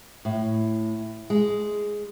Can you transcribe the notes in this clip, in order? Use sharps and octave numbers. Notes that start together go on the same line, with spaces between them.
A2
G#3